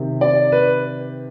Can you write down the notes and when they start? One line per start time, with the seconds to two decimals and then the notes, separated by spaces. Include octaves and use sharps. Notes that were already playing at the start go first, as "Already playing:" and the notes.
Already playing: C3 D#3
0.21 D5
0.52 B4